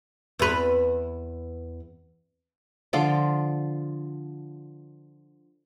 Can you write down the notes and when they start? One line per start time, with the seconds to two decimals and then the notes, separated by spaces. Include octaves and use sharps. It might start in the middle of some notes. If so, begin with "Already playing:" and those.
0.39 E2 B4
2.93 D3 F3 F4 D6